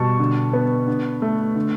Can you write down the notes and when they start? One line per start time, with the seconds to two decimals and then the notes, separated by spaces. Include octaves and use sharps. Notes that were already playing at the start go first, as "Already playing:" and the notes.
Already playing: B2 G3 A5 C#6
0.19 D3
0.53 B3
0.87 D3
1.22 A3
1.56 D3